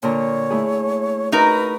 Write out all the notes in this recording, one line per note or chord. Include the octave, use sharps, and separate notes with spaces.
A#2 D3 C#5 A#5
A3 E4 G#4
D#4 F#4 A#4 B4